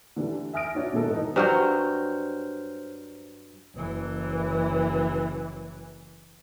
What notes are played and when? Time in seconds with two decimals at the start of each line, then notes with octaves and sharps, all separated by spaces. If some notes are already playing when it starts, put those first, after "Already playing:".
0.16 D3 E3 G3 A3
0.53 E5 G#5 D#6 F6 A#6 D7
0.75 D4 F#4 C#5 E5
0.93 B2 D#3 G#3 E4 A4
1.10 G#2 E3 D#4
1.36 G2 F#3 C5 F6 G6
3.75 F#1 E3